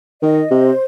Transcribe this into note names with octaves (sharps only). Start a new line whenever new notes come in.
D#3 D#5
C3 C5